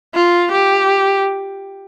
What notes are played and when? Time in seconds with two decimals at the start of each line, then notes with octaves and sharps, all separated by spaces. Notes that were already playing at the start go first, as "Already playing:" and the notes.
0.15 F4
0.52 G4